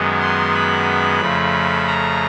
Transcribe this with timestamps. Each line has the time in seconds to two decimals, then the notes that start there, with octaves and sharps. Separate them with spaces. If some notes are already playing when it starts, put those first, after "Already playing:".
Already playing: F#2 D#3 G#3 B3
0.21 C6
0.54 B5
1.20 F2 C#3 F3 A3
1.87 A#5